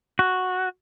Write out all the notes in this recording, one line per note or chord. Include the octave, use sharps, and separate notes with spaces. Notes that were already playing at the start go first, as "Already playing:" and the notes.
F#4